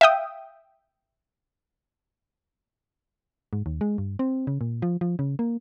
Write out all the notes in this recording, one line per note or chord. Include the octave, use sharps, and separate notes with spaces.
E5 F5 G5 D#6
G#2
D#2
G#3
G2
C4
C#3
A#2
F3
F3
C#3
A#3